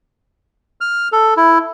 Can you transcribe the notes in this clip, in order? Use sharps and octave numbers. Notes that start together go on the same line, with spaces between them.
F6
A4
E4